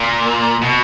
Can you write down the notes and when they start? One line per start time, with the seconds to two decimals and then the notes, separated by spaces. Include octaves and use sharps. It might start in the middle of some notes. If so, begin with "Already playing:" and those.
Already playing: A#2
0.62 B2